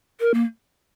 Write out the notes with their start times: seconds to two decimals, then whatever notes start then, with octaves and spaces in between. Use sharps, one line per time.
0.21 A#4
0.34 A#3